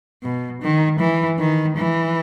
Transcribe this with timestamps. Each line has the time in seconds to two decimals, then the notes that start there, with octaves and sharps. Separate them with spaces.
0.23 B2
0.62 D#3
1.00 E3
1.39 D#3
1.77 E3